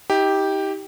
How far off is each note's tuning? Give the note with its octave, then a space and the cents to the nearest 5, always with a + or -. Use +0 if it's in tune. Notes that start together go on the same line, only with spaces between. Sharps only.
D#4 +40 G4 +0